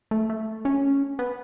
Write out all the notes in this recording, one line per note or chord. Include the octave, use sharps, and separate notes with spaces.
A3
A3
C#4
B3